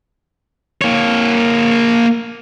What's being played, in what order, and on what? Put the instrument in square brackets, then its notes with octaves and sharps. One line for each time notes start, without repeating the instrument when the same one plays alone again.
[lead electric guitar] A#3 C#5